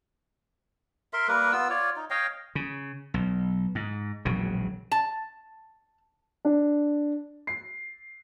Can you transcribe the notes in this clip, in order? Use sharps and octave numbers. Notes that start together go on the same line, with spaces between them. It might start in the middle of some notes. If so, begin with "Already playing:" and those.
A#4 E5 C6
G3 A#3 A#4 B4
B3 F4 E6
F4 C#5 D5
D#4
C#5 D#5 F5 G5
C#3
B1
G#2
E1 A#1 C#3 F#3
A5
D4
C7